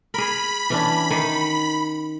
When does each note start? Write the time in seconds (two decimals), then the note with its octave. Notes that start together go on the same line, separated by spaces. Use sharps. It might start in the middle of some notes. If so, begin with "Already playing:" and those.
0.14 G#4 A#4 B5
0.70 E3 C#4 D4
1.10 D#3